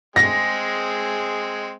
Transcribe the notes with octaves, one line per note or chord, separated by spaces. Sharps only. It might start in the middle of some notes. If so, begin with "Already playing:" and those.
G#3 C4 G#4 A#6